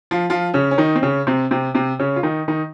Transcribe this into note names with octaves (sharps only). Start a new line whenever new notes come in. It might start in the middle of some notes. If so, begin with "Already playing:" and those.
F3 F4
F3 F4
C#3 C#4
C#4
D#3 D#4
C4
C#3 C#4
C3 C4
C3 C4
C3 C4
C#3 C#4
F4
D#3 D#4
D#3 D#4